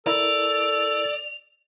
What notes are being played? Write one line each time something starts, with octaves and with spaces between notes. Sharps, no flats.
E4 A4 A#4 D5 F7